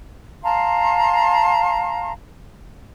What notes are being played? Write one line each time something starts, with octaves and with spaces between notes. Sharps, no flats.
F5 A5 A#5 C6